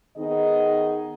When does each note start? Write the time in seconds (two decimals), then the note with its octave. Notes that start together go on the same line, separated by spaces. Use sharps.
0.17 D#3 B3 D#4 G#4 D#5